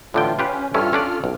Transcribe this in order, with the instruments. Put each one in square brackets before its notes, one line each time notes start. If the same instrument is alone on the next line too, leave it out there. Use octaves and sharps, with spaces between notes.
[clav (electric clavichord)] A2 D3 G5 [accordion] E3 F4
[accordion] C#4 [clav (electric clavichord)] F4 G4 B4
[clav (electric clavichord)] G2 C#4 E4 [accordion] F4 A4 F6
[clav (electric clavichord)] C#4 D4 D5
B1